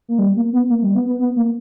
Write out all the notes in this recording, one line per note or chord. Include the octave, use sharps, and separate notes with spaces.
A#3
G3
A#3
B3
A#3
G3
B3
B3
B3
A#3